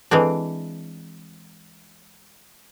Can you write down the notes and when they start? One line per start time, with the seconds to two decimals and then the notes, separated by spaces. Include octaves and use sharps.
0.11 E3 G#3 C4 D4